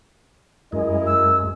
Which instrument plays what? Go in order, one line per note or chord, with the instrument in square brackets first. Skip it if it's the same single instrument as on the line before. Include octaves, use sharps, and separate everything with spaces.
[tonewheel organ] F#2 G#3 [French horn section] E4 A#4 D#5
[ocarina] E6